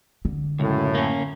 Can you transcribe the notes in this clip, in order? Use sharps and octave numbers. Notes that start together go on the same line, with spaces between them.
D3
C#2 F#2 A2
A#3 C#4